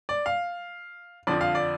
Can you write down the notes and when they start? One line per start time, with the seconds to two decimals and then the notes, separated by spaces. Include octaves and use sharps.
0.09 D5
0.26 F5
1.27 F2 D3 F3 D5
1.41 F5
1.55 D5